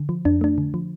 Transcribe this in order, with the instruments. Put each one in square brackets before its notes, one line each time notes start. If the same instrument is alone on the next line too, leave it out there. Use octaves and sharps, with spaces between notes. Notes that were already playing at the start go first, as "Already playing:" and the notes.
Already playing: [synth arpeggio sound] D3
F3
F2 D4
A3 D4
D3
F3